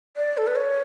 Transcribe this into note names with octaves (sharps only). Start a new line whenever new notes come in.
D5
A4
B4
C#5